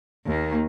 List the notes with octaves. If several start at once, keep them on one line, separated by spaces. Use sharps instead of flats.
D#2 D#3 A#3